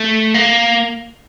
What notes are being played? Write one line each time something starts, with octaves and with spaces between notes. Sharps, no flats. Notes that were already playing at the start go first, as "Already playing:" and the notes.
Already playing: A3
A#3